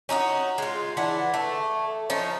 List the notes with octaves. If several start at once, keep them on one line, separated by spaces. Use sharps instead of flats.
C#4 D#4 E4 F#4
G#3 F4
E3 D4 F#5
A3
F3 C#4 D#4